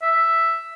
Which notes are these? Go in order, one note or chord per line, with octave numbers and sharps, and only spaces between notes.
E5